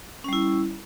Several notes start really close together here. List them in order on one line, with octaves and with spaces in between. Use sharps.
C#4 G3 E4